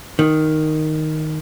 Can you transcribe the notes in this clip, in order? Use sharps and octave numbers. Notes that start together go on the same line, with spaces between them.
D#3